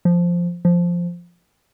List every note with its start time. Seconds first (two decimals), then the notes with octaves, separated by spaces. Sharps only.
0.05 F3
0.65 F3